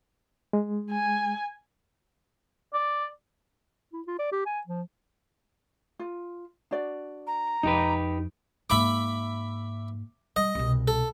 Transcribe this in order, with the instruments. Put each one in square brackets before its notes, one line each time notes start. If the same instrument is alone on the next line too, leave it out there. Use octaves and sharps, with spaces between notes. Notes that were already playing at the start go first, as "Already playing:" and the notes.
[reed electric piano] G#3
[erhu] G#5
[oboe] D5
[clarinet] E4
F4
D5
G4
G#5
F3
[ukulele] F4
D4 F#4 D5
[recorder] A#5
[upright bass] F2 [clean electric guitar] D#4 G4 B4 [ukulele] D#5
[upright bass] G#2 A#3 [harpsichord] E5 B5 D6
[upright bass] G3 [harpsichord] D#5
[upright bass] C2 B2
[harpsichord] A4